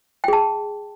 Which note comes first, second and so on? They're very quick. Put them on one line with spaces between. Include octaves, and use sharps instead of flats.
G5 G#4 A5